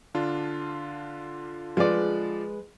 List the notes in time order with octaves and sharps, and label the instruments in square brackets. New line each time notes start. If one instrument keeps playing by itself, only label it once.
[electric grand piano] D3 D4 F4
[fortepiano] F3 D5 [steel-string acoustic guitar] G#3 B4